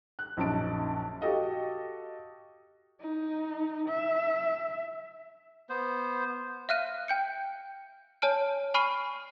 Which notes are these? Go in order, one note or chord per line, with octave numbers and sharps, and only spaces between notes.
F#6
A#1 F#2 D#4 A5 D7
F#4 G4 A4 D#5 F5
D#4
E5
B3 C5
E5 F5 F6 F#6 D#7
G5 G6 C#7
C#5 G#5 A5 F6 D7
G#5 B5 C#6 F6 C7 D#7